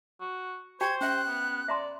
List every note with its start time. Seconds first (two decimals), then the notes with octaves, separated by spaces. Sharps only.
0.21 F#4
0.81 G4 C5 G5 G#6
1.01 C#4 E5 F#6
1.28 B3
1.68 D5 E5 A#5 C6